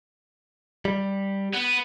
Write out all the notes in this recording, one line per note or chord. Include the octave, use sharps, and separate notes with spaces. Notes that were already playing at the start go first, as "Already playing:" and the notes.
G3
B3